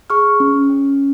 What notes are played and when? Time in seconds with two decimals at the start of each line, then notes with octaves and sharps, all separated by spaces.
0.10 G#4 C#6 F6
0.40 C#4
0.70 C#4